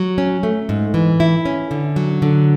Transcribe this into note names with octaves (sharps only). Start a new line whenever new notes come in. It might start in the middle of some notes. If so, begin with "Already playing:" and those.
Already playing: F#3
C#4
A3
G#2
E3
E4
C#4
D3
F#3
D3